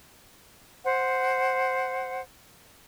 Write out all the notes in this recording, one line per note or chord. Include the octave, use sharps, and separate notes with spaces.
C5 F#5